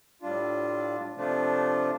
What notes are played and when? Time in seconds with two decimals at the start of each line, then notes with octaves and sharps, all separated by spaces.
0.22 A2 G3 D4 F4
1.15 C3 F3 A3 D4 F4